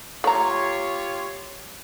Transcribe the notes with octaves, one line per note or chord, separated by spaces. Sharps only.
A3 F4 G4 C#5 A#5